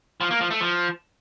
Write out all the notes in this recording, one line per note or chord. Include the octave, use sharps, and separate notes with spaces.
F3
A#3
F3
A3
F3